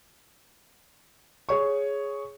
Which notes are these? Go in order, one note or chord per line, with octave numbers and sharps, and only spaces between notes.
G#4 C#5 C#6